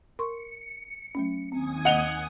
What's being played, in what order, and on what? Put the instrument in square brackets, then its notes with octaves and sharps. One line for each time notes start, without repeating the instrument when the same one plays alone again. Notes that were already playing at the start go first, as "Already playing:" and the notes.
[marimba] A#4 C6 C#6 [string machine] C#7
[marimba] F#3 A3 C#4
[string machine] D#2 G#5 D#6 [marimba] C4
[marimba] D#5 [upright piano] F#5 F7 G7